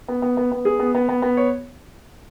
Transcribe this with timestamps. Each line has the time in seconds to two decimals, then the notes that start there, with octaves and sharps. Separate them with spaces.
0.08 B3
0.22 B3
0.37 B3
0.52 B3
0.65 G#4
0.79 B3
0.95 B3
1.09 B3
1.22 B3
1.37 C#5